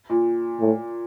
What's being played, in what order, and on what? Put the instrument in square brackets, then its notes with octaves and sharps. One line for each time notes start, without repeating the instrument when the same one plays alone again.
[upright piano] A#2
[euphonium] A2